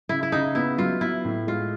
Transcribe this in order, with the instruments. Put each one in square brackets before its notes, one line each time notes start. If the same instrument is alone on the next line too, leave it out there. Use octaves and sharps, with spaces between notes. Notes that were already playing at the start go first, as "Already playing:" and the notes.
[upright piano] C#3 [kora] E4
[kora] E4
[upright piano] C#3 [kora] D#4
[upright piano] B3 [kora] E4
[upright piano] F#3 [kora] F4
[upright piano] B3 [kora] E4
[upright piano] A2
[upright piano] G#3 [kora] F4